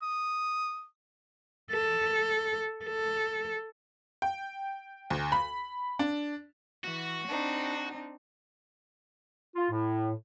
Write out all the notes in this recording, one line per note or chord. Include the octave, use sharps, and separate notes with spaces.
D#6
A4
A4
G5
D2
B5
D4
E3 F#4
C4 D4 D#4
F4
A2